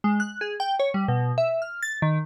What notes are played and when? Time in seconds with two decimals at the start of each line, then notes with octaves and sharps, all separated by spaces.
0.04 G#3
0.20 F#6
0.41 G#4
0.60 G5
0.80 C#5
0.94 G3
1.08 B2
1.38 E5
1.62 F6
1.83 A6
2.02 D#3